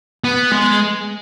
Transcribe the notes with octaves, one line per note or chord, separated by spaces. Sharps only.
B3
G#3